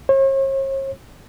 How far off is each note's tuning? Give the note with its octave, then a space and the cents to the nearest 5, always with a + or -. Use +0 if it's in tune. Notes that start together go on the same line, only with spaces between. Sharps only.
C#5 -45